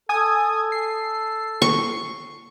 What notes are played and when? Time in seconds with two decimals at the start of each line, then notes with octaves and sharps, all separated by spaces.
0.09 A4 G#5 D#6
0.72 C7
1.62 C#6